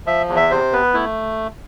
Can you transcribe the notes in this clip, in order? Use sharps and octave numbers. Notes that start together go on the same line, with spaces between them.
F3 E5
E2
E5
C3 C5
B3 B4
A3 E4